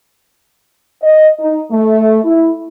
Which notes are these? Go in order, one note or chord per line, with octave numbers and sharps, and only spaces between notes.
D#5
D#4
A3
E4